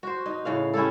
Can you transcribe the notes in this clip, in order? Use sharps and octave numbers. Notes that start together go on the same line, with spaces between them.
F#4 C5
D#4
A2 C#3 F5
C#4 E4 G4 A4